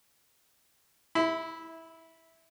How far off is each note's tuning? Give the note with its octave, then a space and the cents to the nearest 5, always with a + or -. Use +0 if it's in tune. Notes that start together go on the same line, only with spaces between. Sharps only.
E4 -15 B5 +30